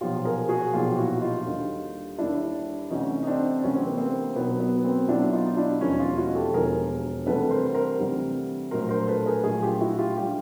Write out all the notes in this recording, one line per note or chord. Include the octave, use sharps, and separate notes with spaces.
B1 A#2 F3 F4 G4
G#4 A#4
F#4 G#4
B1 A#2 F3 F4 G4
G4
E4 F#4
D#4 F4
D#2 D3 G3
D#2 D3 G3 D4 E4
D2 C3 E3 C#4 D#4
D#4
C4 D4
D2 C3 E3 C#4
C4
B3
A#3 C4
B1 B2 F#3 B3
B3
A#3 C4
B1 B2 F#3 D4 E4
D#4 F4
D#4
D4 E4
E1 D#2 D3 F3 C#4 D#4
D#4 F4
E4 F#4
G4 A4
E1 D#2 D3 F3 G#4 A#4
D2 C3 E3 G3 A4 B4
A#4 C5
A#4 C5
D2 C3 E3 G3
A#1 A2 F#3 A#4 C5
A#4 C5
A4 B4
G#4 A#4
A#1 A2 F#3 F#4 G#4
F4 G4
E4 F#4
F4 G4
D3 G3 F4 G4